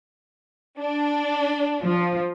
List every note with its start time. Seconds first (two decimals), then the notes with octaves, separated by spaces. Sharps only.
0.79 D4
1.83 F3